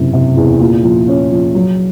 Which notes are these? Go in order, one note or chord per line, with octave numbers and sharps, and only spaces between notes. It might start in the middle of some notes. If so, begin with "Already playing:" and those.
Already playing: F#1 C3 E3
C3
E2
A#2
F3
C#4
F3
F#3